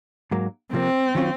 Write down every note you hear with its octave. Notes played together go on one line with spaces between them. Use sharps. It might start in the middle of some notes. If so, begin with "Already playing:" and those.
G#2 F#3 A#3
C3 F3 A#3 C4
D#3 F#3 C#4 F4